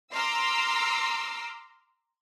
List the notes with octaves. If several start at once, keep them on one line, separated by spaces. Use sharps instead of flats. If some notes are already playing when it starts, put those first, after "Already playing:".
A#5 C6 D6 E6 F6